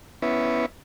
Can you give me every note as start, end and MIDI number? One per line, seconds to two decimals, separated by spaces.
0.22 0.66 59
0.22 0.66 61
0.22 0.66 64